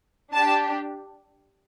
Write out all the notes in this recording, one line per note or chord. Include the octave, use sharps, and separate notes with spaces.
D4 G4 A5